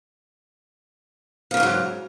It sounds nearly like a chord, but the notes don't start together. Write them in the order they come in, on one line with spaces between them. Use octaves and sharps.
F3 C#3 E2 G#2 F#3